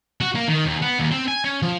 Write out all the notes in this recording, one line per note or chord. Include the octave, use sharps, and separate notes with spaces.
F#4
A#3
D#3
D#2
B3
D#2
C4
G#5
C#4
F3